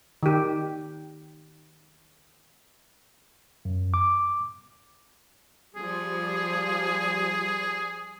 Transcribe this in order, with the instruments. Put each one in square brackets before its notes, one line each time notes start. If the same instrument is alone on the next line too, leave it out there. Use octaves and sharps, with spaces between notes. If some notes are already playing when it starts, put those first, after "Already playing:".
[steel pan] D#3 G4
[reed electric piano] F#2
D6
[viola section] F3 G3 [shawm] G#4